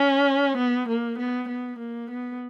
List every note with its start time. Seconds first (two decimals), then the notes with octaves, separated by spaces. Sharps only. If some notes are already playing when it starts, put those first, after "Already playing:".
Already playing: C#4
0.57 B3
0.88 A#3
1.18 B3
1.48 B3
1.78 A#3
2.10 B3